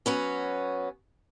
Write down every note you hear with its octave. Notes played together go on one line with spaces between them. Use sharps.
F#3 B3 C#4